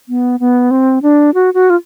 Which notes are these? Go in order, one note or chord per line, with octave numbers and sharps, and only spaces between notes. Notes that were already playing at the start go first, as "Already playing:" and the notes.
B3
B3
C4
D4
F#4
F#4
F4